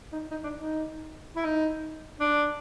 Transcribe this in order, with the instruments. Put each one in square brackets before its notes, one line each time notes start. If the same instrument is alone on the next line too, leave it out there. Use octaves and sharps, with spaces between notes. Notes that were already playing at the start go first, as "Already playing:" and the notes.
[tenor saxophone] D#4
D#4
D4
D#4
E4
D#4
D4